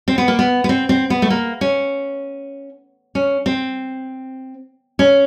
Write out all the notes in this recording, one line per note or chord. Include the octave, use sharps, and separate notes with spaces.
C4
B3
A#3
B3
B3
C4
C4
B3
A3
A#3
C#4
C#4
C4
C#4